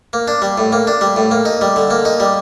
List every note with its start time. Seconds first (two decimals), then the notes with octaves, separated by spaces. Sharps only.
0.13 A#3
0.28 D4
0.42 G3
0.58 A2
0.72 A#3
0.87 D4
1.01 G3
1.16 A2
1.31 A#3
1.45 D#4
1.61 G3
1.76 D3
1.91 A#3
2.05 D#4
2.20 G3